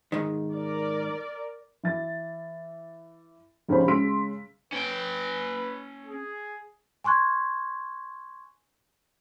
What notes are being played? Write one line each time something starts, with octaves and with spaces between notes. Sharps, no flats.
G#2 D#3
A#4 D5
E3 A6
F1 C#2 C#4 D#4 C5 B5
C#3 G#3 C6 E6 B6 D7
C#4 B4 G5
G#4
G#5 C6 C#6 F#6 G#6